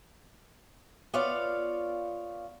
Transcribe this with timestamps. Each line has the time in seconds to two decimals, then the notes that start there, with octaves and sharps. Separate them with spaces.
1.14 B3 F4 C#5 D5 F5